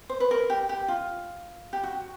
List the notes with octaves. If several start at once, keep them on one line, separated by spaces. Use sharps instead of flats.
C5
B4
A#4
G4
G4
F4
G4
F#4